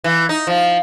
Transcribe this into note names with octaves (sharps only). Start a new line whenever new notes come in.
E3
D#4
F3